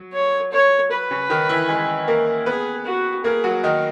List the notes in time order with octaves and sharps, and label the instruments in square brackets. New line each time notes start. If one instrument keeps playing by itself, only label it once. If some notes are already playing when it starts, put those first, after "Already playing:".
Already playing: [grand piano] F#3
[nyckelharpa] C#5
C#5
B4
[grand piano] C#3 C#4
D#3 D#4
E3 E4
G#3 G#4
A#3 A#4
[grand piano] B3 B4 [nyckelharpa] G#4
[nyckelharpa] F#4
[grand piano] A#3 A#4 [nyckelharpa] G#4
[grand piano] F#3 F#4
D#3 D#4